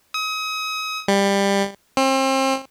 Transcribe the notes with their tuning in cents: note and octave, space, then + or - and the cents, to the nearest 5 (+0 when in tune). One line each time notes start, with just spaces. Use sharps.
D#6 +35
G3 +20
C4 +35